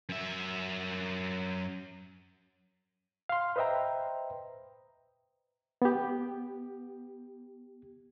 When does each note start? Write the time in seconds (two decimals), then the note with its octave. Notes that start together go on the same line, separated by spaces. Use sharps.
0.09 F#2 E5
3.29 F5 C6
3.56 B4 C5 D#5 E5 G5 A#5
5.82 B3 G4